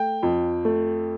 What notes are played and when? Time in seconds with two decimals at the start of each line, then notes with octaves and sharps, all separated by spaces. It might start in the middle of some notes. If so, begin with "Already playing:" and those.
Already playing: A3 G5
0.23 F2
0.65 A3